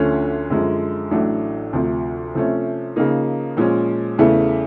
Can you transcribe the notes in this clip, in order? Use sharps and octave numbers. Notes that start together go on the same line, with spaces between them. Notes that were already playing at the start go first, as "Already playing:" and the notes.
Already playing: D2 D3 F3 A3 C#4
F#2 D3 F3 G#3
A1 A2 F#3 A3 D4
D2 C3 F3
C3 F3 A3 C#4
C#3 F3 A#3 D#4
A#2 F3 G#3 C#4
E2 C#3 E3 A3